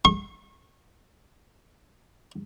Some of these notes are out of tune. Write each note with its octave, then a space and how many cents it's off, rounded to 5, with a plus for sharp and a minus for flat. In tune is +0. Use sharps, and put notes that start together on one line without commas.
C#6 -40